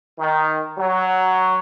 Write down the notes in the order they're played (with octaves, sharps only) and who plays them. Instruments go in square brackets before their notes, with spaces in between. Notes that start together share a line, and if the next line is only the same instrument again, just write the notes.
[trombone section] D#3
F#3